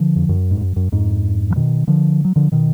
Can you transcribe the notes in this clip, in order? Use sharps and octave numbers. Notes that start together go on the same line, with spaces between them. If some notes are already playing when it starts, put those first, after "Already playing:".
Already playing: D3 F3
F2
F#2
G#2
F#2
F#2
F2 G#2
F3
B2 D#3
D3 F3
F#3
D3 F3
B2 D#3